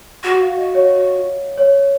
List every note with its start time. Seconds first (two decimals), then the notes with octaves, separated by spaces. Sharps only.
0.24 F#4 F#5
0.41 F5
0.58 D#5
0.75 C#5
1.58 C#5